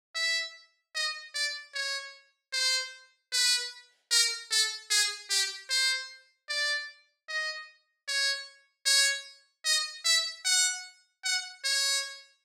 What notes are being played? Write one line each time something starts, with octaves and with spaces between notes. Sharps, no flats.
E5
D#5
D5
C#5
C5
B4
A#4
A4
G#4
G4
C5
D5
D#5
C#5
C#5
D#5
E5
F#5
F#5
C#5